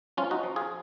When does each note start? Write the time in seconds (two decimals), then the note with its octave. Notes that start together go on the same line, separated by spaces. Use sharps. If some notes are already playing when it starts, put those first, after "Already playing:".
0.17 F3 C#4 F4
0.31 D#4 F#4
0.43 F3
0.56 F4 G#4